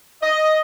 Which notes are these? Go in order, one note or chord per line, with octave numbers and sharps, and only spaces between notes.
D#5